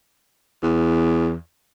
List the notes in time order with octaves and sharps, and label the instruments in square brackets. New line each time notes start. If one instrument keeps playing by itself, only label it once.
[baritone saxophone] E2